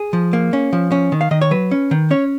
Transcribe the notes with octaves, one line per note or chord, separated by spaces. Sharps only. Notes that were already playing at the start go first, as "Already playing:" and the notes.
Already playing: G#4
F3
A#3
C#4
F3
C#4
D#3
F5
D#3 D#5
C#5
F#3 B4
C#4
D#3
C#4 C#5